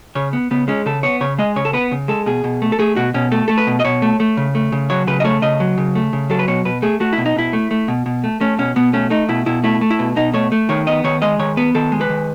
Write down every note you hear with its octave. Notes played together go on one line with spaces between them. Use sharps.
C#3 C#5
B3
C#3 B3
G#3 C#4
C#3 A4
B3 C#5
C#3 C#5
G#3 D#5
C#3 C#5
A4
B3 B4
C#3
G#3 A4
B2 G#4
B2
A3
A4
A3 G#4
B2 F#4
B2 C#4
A3 A4
A3 A4
B4
B2
D#5
B2 C#5
A3
A3
C#3
A3
C#3
F#3 C#5
C#3 B4
D#5
A3 C#5
C#3 D#5
F#3
C#3
A3
C#3
F#3 A4
B4
B2 C#5
B2 B4
A3 G#4
A3 F#4
B2 E4
D#4
B2 E4
A3
A3
B2
B2
A3
A3 C#4
B2 C#4
B2 B3
A3 C#4
A3 D#4
B2 E4
B2 E4
A3 E4
A3
E4
B2
B2 D#4
A3 C#5
A3
D#3 C#5
B3 D#5
D#3 C#5
G#3 D#5
D#3 C#5
B3 B4
D#3 A4
G#3
B4
D#3